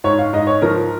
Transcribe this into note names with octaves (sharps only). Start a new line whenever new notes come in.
G#2 C#5
F5
G#2 D#5
C#5
F3 A#4